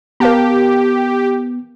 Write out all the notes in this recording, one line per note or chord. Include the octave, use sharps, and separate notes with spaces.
B3 G4 A#4 F5 A5